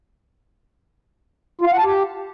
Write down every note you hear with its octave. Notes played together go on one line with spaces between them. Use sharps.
F4
F5
F#5
A5
G4